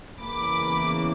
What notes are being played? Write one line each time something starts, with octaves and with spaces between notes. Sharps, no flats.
E2 C#3 E3 A#3 B5 D6